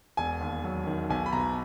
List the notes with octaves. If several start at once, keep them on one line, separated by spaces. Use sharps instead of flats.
E1 G#5
D#2
F#3
D#3
B1 G#5
B5
B2 A#5